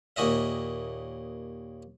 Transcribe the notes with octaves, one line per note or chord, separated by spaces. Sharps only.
D#2 A#2 F#4 D#5 E5